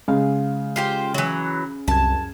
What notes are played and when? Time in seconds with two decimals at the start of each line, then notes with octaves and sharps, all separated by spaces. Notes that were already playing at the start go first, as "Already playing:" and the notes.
0.08 C#3 G#3 F5
0.76 F4 G4 C5
1.14 E3 F#3
1.88 C2 F#2 A5 G#6